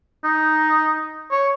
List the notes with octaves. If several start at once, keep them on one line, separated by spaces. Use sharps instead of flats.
D#4
C#5